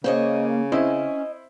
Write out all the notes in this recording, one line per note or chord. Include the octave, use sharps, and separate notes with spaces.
C#3 A#3 C5 C#5 D#5
C4 C#4 E4 D#5